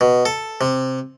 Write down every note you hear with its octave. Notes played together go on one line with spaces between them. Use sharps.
B2
A4
C3